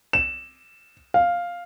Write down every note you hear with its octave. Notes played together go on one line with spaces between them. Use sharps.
E7
F5